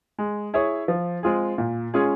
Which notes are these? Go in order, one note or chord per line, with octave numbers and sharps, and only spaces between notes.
G#3
E4 G#4 C#5
F3
G#3 C4 F4 G#4
A#2
G#3 C#4 F4 G#4